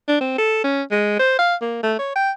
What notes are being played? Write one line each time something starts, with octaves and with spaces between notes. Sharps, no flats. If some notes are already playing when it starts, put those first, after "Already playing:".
D4
C4
A4
C#4
G#3
C5
F5
A#3
A3
C#5
G5